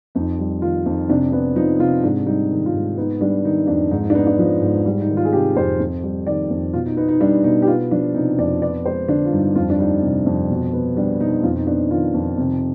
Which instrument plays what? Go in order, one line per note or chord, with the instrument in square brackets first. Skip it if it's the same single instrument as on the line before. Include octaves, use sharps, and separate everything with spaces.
[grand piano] F2 D#4
G3
D#3 F4
F2 D#4
C3 D4
B3 D4
F3 D#4
C3 F4
G#2 D4
G3 D#4
D#3
F4
G#2
B3 D#4
G3 D4
D#3 D#4
F2 D4
G#2 D#4
D#4
D4
B3 D#4
D4
F3
G#2
G3
D#4
D#3
F4
G#4
C3 G4
F2 C5
F2
G3
D#3 D5
F2
B2 F4
D#4
B3 D#4
D#4
G3 D4
B2 D#4
G4
B3 F4
F3 D4
C3 D#4
F2 D5
B3 D5
G#3 C5
D3 D4
F4
G2 D#4
F2 F4
D4
G3 D#4
C3
F2
B2
B3
G3 D4
B2 D#4
F2 F4
D#4
B3 D4
D#4
D#3 F4
F2
C3